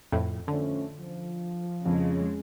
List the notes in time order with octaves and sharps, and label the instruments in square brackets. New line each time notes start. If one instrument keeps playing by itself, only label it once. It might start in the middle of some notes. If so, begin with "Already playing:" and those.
[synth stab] F2 A2
[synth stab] D3 [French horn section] F3 A3 C#4
[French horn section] F3
[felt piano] F2 [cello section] C#3 G#3